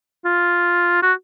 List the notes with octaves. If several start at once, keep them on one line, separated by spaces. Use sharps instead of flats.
F4
F#4